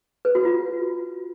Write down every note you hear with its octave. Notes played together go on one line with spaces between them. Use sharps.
B4
F#4
F4